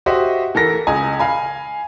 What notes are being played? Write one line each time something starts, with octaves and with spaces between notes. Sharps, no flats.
F#4 G4 C5 D#5 E5
E3 A4 A#4 A#6 B6
C#2 D#5 G#5
F5 G#5 B5